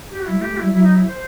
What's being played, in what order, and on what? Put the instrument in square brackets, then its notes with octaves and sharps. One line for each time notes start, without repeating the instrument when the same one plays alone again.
[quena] G4
F#4
[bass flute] G3 [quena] E4
[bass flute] A3
[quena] G4
[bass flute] A3
[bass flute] G3 [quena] E4
[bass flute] F#3 [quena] E4
[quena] D#4
E4
C5